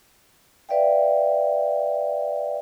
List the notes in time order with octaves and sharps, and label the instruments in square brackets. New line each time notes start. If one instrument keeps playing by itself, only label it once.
[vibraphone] B4 D5 E5 F5 G5